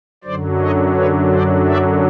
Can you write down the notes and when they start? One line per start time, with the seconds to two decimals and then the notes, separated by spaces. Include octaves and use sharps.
0.24 F#2 D3 F#3 C5 D5
0.60 C#5 D#5
0.95 B4 C#5
1.32 C5 D5
1.67 D5 E5